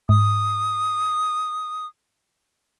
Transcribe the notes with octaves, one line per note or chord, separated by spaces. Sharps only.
G#2 D#6